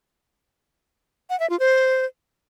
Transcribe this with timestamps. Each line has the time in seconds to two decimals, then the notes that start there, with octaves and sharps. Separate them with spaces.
1.30 F#5
1.40 E5
1.50 F4
1.60 C5